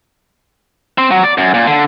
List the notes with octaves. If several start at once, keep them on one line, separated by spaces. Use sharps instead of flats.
C4
F#3
D5
F#2
A#2
D3